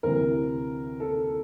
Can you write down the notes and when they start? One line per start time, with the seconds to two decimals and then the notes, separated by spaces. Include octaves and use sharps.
0.03 D2 C3 E3 A#4
1.00 A4